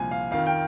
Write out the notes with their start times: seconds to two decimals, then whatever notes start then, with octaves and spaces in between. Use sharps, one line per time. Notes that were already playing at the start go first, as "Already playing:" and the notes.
Already playing: C2 A#2 F3 G#5
0.11 F5
0.31 F2 D#3 F5
0.46 G5